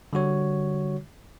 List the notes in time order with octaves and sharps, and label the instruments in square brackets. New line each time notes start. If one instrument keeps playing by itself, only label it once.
[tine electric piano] D3 G3 F#4 C#5